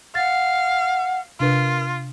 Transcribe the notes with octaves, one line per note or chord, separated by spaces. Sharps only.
F5 F#5 A6
C3 D4 F4 A#4 B4